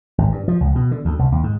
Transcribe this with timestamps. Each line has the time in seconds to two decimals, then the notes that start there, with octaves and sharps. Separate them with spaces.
0.18 G#1
0.32 G2
0.48 F3
0.60 C#2
0.75 B2
0.91 D3
1.05 D2
1.19 C2
1.32 D#2
1.44 G#2